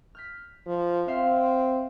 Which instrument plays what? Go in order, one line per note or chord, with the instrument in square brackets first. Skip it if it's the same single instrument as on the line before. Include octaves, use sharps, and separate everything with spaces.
[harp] F6 G6 B6
[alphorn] F3
[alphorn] C4 [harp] C5 E5 F5